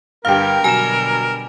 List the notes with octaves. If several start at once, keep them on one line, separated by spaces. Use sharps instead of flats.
G2 D3 G3 G4 A#4 F5 F6
B2 D3 F#3 G3 G#5 E7